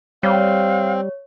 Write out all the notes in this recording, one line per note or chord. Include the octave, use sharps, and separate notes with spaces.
G3 C4 C#5 F5